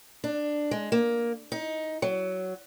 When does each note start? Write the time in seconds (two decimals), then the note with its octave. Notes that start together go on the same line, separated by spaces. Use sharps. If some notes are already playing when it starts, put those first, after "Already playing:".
0.24 D4
0.71 G#3
0.92 A#3
1.52 D#4
2.02 F#3